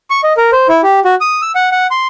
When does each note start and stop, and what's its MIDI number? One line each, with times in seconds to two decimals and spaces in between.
0.10 0.21 85
0.24 0.33 75
0.37 0.51 70
0.52 0.67 72
0.69 0.81 64
0.83 1.00 67
1.05 1.15 66
1.21 1.41 87
1.42 1.52 88
1.55 1.69 78
1.72 1.87 78
1.91 2.07 84